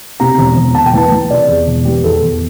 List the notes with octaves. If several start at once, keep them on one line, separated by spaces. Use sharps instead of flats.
C3 A#5
E1
E1
E1 A5
G5
E3 A5
E3
C3 D5
E2
E1
E3 G4
E2 A4
E2